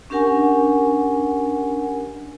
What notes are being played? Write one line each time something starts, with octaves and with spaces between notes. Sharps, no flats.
C#4 D4 G4 A#4 F#5 G#5